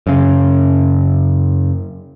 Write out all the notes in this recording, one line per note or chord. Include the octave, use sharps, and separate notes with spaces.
F#2 C#3